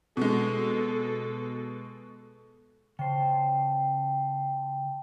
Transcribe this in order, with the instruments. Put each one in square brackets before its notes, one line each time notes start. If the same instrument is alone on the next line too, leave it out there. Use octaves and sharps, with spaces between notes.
[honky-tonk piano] B2 G#3 [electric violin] A4
[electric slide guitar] C#3 C5 [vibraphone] G5 A5